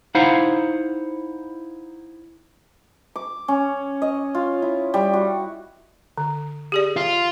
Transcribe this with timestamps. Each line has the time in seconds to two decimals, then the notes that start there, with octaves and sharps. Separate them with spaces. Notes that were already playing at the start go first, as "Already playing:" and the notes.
0.15 D#4 E4 C5 F5 F#5
3.16 D6
3.48 C#4
4.02 D#5
4.35 F4
4.62 E4
4.94 G3
5.13 F#4
6.17 D3
6.72 G4 G#4 D5
6.96 F4